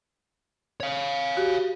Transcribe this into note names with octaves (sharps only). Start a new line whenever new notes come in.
C#5 F5
F#4 G4